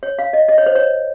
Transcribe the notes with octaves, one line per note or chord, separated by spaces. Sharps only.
C#5
F5
D#5
D#5
C#5
C5
C#5